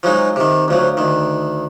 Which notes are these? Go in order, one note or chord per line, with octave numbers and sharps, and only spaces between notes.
F3 F#3 G#3 D#4
C3 D#3
D2 F3 F#3
D2 D#3